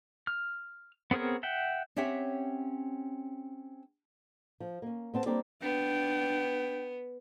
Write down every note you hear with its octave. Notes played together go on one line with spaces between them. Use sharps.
F6
B3 C4 G#4 A#4 C#5
E5 F#5 G5
C4 C#4 G4 C#5 E5 F#5
F3
A#3 C#4
B3 C4 A5
G3 A#3 C4 D4 C#5 D5
B3 D4 G5